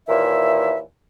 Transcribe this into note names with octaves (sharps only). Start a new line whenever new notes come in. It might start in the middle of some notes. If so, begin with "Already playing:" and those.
D#2 A#2 E3 E5